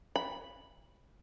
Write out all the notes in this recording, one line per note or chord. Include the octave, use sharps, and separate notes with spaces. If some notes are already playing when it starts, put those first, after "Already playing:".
B5